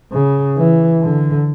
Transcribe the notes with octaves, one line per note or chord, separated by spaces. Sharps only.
C#3
E3
D3